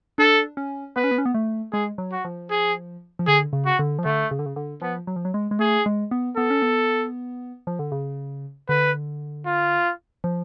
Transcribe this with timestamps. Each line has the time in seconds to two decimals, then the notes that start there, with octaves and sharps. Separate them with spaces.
0.18 D4 A4
0.57 C#4
0.96 B3 B4
1.04 C#4
1.11 B3
1.18 C#4
1.26 B3
1.35 A3
1.73 G#3 G#4
1.98 F#3
2.12 F#4
2.25 F3
2.50 G#4
3.19 F3
3.27 D3 G#4
3.53 C#3
3.66 F#4
3.79 D3
3.99 F3
4.04 D3 A3
4.31 C#3
4.39 D3
4.46 C#3
4.56 D3
4.82 F3 B3
5.07 F#3
5.16 F3
5.25 F#3
5.34 G#3
5.51 G#3
5.59 A3 G#4
5.86 G#3
6.11 B3
6.36 B3 A4
6.50 C#4
6.62 B3
7.67 F3
7.79 D3
7.92 C#3
8.69 D3 B4
9.46 F4
10.24 F3